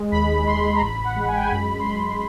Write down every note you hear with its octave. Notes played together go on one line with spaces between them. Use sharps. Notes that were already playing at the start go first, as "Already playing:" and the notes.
Already playing: G#3
D#2 B5
D#2 C6
A#5
A1 B5
F#5
G#3
G#5
G5
G#5
F#2 B5
C6
F#2 B5